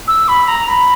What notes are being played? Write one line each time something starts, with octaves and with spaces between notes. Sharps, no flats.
E6
B5
A#5
B5